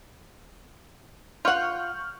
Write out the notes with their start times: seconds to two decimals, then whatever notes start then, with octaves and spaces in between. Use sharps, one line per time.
1.45 F4 F#5 C#6 F6 G6